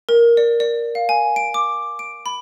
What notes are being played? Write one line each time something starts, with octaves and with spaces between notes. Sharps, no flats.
A#4
D5
D5
F5
G#5
D7
D6
D7
B5